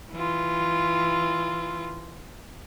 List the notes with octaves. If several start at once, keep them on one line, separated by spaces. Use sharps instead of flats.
E3 F4